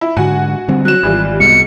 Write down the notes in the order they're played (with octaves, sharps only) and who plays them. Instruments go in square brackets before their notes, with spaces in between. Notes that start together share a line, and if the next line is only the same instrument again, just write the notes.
[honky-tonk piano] E4
[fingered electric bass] G#2 D3 [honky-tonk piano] F#4 F#5 G#5
[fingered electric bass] D3 G3 C4
[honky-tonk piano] F#3 E7 [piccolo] F#6
[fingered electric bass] G#1 [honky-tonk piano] E3 G3 F4
[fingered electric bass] C2 [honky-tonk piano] G#2 B2 [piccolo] C#7